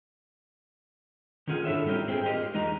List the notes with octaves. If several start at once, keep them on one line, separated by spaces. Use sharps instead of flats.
D#3 C#4 F4 G#4 F#5
G#2 D4 E4 A4 C#5 E5
G3 C4 C#4 D#4 F4 G4
G#2 G#3 G#4 C5 G5
F4 G4 A#4 D#5 F5
E2 D#3 G#3 D#4 D#5 A#5